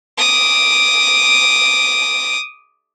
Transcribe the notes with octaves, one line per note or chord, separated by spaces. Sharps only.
D6 D#6